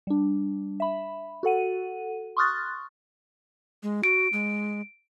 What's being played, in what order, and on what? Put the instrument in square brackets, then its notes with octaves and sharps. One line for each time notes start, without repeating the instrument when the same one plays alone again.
[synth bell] G3 D4
E5 B5
F#4 A4 F#5 D#7
C6 C#6 D#6 F6 F#6 A6
[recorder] G#3
[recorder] F#4 [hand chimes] D7
[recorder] G#3